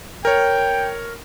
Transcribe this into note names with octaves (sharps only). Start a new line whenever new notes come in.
A#4 C#5 G5